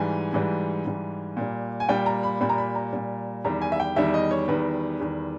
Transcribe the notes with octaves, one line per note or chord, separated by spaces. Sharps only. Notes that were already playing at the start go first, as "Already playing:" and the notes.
Already playing: G#2 E3 G3 G#5
G#2 E3 G3
G#2 E3 G3
A#2 G3
G#5
A#2 G3 G5
A#5
B5
A#2 G3 B5
A#5
B5
A#5
A#2 G3
E2 D#3 G3 A#5
G#5
E5
G5
E2 D#3 G3 E5
D#5
C#5
E2 D#3 G3 B4
E2 D#3 G3